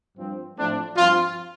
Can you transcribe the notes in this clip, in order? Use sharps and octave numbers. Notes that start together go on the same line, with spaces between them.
G2 F3 C4
A2 F3 A3 C4 D4
G2 F3 C4 F4